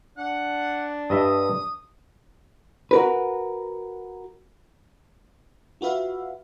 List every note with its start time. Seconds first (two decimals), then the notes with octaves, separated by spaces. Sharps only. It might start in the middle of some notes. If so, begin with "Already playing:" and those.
0.17 D4 F#5
1.10 G2 D#5 E5 D#6
2.91 F#4 A#4 B4
5.81 F4 F#4 B4 E5 F5